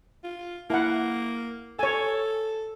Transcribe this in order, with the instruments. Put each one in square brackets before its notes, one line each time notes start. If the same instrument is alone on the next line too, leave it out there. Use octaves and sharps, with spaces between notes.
[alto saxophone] F4
[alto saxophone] A#3 [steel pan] E4 F#5
[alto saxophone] A4 [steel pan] C#5 G#5